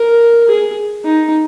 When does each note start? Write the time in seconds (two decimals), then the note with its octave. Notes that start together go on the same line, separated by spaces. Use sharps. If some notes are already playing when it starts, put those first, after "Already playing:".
Already playing: A#4
0.48 G#4
1.05 D#4